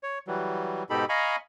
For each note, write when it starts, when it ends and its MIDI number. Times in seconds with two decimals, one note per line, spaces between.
0.03 0.19 73
0.27 0.83 52
0.27 0.83 54
0.27 0.83 55
0.90 1.05 44
0.90 1.05 47
0.90 1.05 63
0.90 1.05 67
0.90 1.05 69
0.90 1.05 83
1.09 1.36 75
1.09 1.36 77
1.09 1.36 80
1.09 1.36 82
1.09 1.36 83
1.09 1.36 85